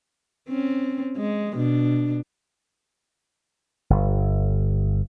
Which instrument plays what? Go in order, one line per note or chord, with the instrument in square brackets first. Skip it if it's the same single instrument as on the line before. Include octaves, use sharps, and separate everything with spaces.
[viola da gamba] C4 C#4
G#3
B2 D4
[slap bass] G1